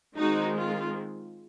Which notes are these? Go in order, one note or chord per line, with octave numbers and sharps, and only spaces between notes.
D#3 G#3 C4 D#4 F#4
F4